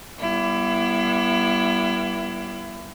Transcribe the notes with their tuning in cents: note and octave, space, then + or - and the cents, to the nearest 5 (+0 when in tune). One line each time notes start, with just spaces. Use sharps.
G3 -20 B3 -35 E4 +25